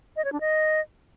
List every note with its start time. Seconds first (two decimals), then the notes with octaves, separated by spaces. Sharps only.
0.16 D#5
0.24 C#5
0.33 D4
0.41 D#5